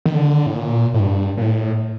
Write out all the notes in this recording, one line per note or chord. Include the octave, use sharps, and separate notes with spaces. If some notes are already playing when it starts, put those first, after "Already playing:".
D#3
D3
A2
A#2
A2
G2
A#2
A2